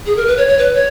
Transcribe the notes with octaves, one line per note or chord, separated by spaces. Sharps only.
G#4
A#4
B4
C#5
C#5
B4
C#5